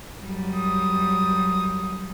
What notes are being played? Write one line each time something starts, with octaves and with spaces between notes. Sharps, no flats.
F#2 G3
D#6